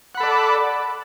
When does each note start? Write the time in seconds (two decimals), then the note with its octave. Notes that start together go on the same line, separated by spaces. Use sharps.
0.15 F#5
0.17 B5
0.20 A4
0.23 D5